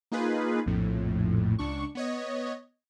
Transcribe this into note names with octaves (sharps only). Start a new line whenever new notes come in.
A#3 D#4 F4 G#4 B4
A#1 F2 A2
C#2 D4 C#6
B3 C#5 D#5